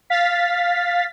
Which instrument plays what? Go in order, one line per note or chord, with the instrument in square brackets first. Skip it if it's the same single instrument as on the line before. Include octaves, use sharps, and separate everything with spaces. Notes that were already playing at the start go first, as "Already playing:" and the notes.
[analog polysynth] F5 A6 B6